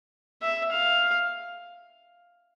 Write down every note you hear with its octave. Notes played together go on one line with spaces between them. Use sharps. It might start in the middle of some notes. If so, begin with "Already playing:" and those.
E5
F5